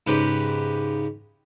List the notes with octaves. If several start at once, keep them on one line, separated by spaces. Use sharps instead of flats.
G#2 C#3 G4 B4